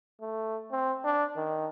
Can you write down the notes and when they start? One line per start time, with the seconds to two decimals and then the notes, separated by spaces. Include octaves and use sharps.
0.21 A3
0.72 C4
1.05 D4
1.36 D#3